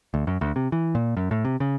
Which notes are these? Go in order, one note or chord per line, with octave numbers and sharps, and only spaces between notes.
D2
F#2
D2
C3
E3
A#2
F#2
A2
C3
C#3